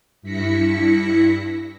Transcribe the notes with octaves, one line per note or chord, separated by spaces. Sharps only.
G2 E4 A#6 B6 C#7